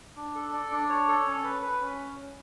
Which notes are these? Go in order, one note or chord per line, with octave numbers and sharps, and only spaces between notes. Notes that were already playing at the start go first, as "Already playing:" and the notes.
D4
A4
D5
D4
C#5
A4
C#4
B4
B4
C#4